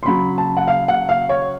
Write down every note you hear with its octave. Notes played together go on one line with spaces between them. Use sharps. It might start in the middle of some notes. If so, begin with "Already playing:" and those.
C6
C#3 F#3 B5
A5
F#5
F5
F#5
F5
C#5